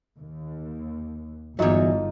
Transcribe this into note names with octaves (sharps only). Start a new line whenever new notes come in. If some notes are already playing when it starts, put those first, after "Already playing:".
D#2
G1 E2 F#3 D#4 F4